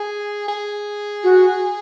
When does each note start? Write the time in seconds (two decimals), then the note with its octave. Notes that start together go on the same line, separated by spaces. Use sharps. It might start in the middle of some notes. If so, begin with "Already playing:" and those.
Already playing: G#4
0.49 G#4
1.23 F#4